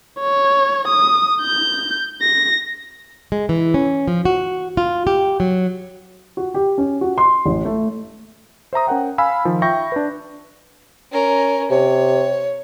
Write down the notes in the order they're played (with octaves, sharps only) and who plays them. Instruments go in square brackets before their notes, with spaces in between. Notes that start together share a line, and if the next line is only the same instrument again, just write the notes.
[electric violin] C#5
D#6
G6
A#6
[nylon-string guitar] G#3
E3
C#4
F3
F#4
F4
G4
F#3
[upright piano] F#4
G4
C#4
F#4
C6
A1
A3
[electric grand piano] C5 E5 A#5 D#6
C#4 A#4 F#5 G5
F5 G#5 B5 E6
D#3 F3
E5 G5 B5 C#6 G6 A#6
D4 B4
[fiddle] C#4 A#4
[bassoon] C3 [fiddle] C#5